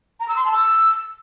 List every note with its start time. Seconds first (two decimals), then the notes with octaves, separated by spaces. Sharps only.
0.20 A#5
0.28 E6
0.36 C6
0.45 A5
0.53 E6